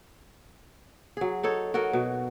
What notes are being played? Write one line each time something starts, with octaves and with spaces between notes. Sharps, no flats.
F#3 G#4
D#4 A4 C#5
F#4 A4 A#4 D#5
B2